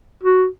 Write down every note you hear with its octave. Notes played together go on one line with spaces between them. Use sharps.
F#4